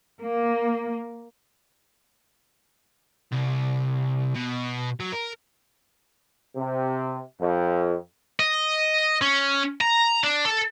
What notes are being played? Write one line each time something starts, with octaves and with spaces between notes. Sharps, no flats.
A#3
C2
B2
F#3
A#4
C3
F2
D#5
C#4
A#5
D4
A4